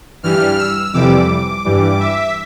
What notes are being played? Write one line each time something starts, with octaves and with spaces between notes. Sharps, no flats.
G2 E3 G3 F6
E6
F2 C3 E3 G3 D6
G2 E3 G3
E5